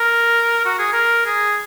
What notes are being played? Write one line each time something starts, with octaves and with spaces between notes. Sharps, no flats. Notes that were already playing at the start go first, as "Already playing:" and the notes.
Already playing: A#4
F#4
G#4
A#4
G#4